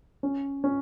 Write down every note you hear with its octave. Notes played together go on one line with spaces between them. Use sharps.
C#4
C#4